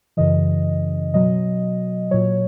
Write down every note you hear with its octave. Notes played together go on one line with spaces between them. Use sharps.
F#2 C#3 E3 D#5
B2 F#3 D#5
A#2 F#3 C#5